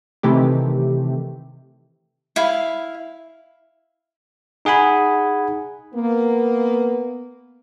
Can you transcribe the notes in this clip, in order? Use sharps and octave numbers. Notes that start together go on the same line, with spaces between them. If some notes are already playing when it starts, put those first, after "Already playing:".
C3 D#3 E3 A3 G4
E4 F5
D#4 G#4 F#5 G#5 B5
A#3 B3